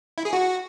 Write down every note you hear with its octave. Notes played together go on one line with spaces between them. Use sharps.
E4
G#4
F#4